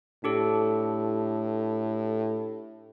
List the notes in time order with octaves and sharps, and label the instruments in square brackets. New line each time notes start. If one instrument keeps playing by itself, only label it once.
[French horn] A2 [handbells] D4 G4 A4